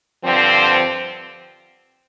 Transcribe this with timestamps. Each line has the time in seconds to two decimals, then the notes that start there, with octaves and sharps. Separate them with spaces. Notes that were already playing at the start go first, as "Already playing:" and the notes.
0.24 G2 D3 F3 C4